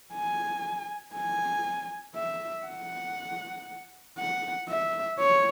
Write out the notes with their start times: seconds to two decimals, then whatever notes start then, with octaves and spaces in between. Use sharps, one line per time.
0.14 G#5
1.15 G#5
2.15 E5
2.66 F#5
4.18 F#5
4.69 E5
5.19 C#5